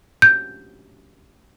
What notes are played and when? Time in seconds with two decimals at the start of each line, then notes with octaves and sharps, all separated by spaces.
0.22 G6